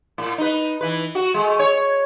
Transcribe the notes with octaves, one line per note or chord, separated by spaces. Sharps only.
A2
D#4 B4
E3 B4
F#4
G#3 A3
C#5